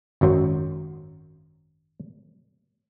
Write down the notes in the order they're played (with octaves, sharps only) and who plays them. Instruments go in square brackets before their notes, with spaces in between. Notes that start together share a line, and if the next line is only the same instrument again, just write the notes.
[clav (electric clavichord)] G#1 F#2 F#3 C5